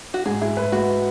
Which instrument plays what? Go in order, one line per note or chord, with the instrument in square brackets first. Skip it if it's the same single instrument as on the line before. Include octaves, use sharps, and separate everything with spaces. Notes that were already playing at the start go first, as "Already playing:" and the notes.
[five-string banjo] F#4
[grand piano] G#2 [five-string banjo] G#4
[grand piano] E4 [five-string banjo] G#4
[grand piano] B4
[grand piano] G#3 [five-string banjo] F#4